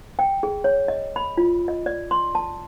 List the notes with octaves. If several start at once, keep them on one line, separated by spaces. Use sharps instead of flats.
G5
G#4
C#5
D#5
B5
F4
D#5
D5
C6
A5